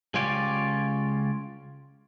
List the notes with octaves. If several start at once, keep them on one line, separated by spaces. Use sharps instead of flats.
C#2 C#4 F4 G4 C#5 D5